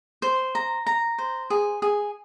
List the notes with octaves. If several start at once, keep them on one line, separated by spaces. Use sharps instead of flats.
C5
A#5
A#5
C5
G#4
G#4